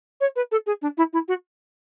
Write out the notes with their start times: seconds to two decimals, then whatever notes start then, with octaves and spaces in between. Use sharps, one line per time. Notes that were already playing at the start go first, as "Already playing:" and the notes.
0.20 C#5
0.36 B4
0.51 A4
0.66 G#4
0.81 D4
0.97 E4
1.13 E4
1.28 F#4